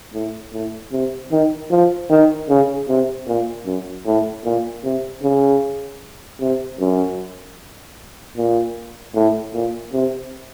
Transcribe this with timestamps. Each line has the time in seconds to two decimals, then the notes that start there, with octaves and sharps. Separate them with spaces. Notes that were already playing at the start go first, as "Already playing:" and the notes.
0.14 A2
0.53 A2
0.92 C3
1.32 D#3
1.71 F3
2.10 D#3
2.49 C#3
2.88 C3
3.28 A#2
3.66 F#2
4.06 A2
4.45 A#2
4.84 C3
5.23 C#3
6.41 C3
6.80 F#2
8.37 A#2
9.15 A2
9.54 A#2
9.93 C3